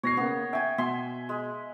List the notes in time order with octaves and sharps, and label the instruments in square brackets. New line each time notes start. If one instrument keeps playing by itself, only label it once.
[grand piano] B2 A#6 C7 [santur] C#5
[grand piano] C#3 A#3 [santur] B3
[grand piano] E5 [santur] G5 G#5
[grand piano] B2 [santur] E5 G#5 C6
[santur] G#3